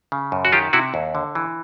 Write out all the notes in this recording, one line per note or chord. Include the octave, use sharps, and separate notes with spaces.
C#3
F#2
F#4
D#3 F4 G4
C3 E4 F#4
D#2
D3
E3